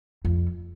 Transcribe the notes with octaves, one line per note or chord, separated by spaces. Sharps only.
F2